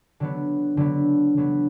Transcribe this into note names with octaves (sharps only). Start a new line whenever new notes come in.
D3 F#3 B3
D3 F#3 B3
D3 F#3 B3